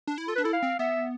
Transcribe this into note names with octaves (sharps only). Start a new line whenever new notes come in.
D4
E4
F4 A4
D4 B4
E4 A4
F5
C4
B3 E5